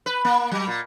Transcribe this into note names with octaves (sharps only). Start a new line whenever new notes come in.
B4
A#3
F#3
A#2